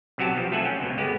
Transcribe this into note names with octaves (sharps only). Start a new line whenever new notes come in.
B1 C3 F#3 F#4 G4 A5
F3
A3 F4 A4 E5 F#5 G#5
C#4 G5
C#2 B2
G1 G#3 B3 G4